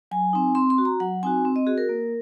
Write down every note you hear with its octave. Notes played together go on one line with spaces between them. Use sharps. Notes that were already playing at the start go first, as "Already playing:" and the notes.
F#3 G#5
C4 D#4
C4 C6
C6
F#4
A#5
F#3 F#5
C4 D#4 F#4 G#5
C4
D#5
F#4 G#4
A#4
A#3